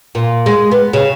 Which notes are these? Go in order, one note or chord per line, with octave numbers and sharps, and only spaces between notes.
A#2
G#3
B3
C#3